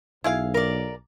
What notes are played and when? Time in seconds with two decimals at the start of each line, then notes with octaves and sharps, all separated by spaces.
0.24 B1 E4 G#4 F5
0.54 A#4 D5